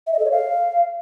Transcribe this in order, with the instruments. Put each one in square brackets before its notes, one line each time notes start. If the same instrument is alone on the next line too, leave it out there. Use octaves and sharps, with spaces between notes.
[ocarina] E5
D#5
A4
C#5
F5